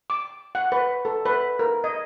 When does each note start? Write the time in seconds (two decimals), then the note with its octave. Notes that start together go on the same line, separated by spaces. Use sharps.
0.10 D6
0.55 F#5
0.72 B4
1.05 A4
1.25 B4
1.59 A#4
1.84 D#5